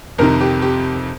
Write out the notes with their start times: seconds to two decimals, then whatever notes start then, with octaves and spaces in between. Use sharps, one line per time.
0.18 F2 C3 D#3 A#4
0.41 G4
0.62 G4